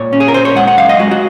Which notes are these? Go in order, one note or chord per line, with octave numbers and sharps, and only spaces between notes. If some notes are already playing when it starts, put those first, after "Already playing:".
Already playing: A#2 C#5
C#4
G#4
A#4
A#2 C5
C#5
G#3 F#5
F#5
F#2 F5
D#5
G#3 F#4
F#4